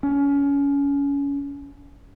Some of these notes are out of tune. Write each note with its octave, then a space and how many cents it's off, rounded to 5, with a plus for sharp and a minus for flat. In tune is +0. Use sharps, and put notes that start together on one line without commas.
C#4 +25